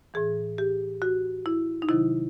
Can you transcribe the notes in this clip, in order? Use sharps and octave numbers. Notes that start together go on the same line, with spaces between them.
A2 E3 G#4
G4
F#4
E4
D#4
C3 D#3 F#3 E4